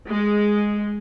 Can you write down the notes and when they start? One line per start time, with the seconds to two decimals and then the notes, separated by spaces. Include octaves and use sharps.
0.11 G#3